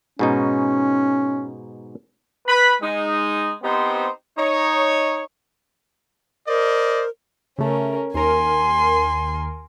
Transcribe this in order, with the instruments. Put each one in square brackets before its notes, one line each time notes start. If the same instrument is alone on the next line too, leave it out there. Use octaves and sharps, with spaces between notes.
[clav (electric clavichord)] G#2 B2 D#4 [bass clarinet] C#4
[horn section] B4 B5
G#3 D#4
B3 C4 D#4 G4 C5
D#4 C#5
[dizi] A#4 [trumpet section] C5 D5 D#5
[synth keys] C#3 A3 [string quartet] C#4 A#4
[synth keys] D#2 A#4 [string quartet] G#5 C6